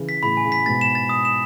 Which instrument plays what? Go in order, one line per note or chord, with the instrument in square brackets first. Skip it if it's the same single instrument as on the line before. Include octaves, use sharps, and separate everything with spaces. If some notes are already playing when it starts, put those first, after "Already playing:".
Already playing: [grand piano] C#3 E3
[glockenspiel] B6
[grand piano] A2 C#3 [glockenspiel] B5
[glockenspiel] G#5
[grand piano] A2 C#3
[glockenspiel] B6
[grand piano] G#2 B2 [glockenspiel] A6
[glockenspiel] E7
A6
D#6
E7